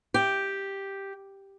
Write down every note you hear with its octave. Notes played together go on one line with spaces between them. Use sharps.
G4